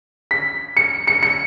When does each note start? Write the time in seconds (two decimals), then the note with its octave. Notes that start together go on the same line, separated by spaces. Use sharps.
0.31 B6
0.77 C#7
1.07 C#7
1.23 C#7